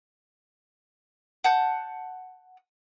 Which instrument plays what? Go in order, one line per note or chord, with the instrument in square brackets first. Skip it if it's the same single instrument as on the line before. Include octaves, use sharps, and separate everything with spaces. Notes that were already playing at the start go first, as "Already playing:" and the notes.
[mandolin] F#5 A5 G6